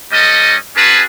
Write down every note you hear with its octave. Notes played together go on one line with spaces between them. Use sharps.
G3 C#4 A4 D#5
C#4 F#4 G#4 B4 A5